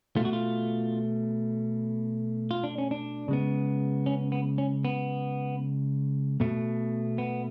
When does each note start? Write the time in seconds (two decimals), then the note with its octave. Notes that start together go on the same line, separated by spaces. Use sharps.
0.16 A3 F4
0.21 B2 F#4
0.33 F4
2.51 F4
2.64 D4
2.78 C#4
2.91 D4
3.28 C#3 G#3 B3
4.06 C#4
4.32 B3
4.58 C#4
4.85 B3
6.40 B2 A3
7.18 B3